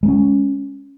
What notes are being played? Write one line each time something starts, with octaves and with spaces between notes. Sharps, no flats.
G#3 A#3 C#4